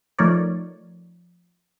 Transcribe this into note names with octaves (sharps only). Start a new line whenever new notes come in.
F3 A3 D#4 A#4 C#5 D5